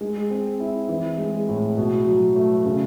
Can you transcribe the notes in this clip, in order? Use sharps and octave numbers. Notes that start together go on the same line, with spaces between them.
G#3
C4
E4
E3
G#3
A2
B2
F#3
A3
C#3